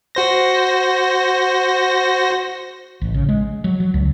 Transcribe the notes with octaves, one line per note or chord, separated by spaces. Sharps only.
F#4 C5 A#6
A1
C#3
G#3
F#3
F#3
C#2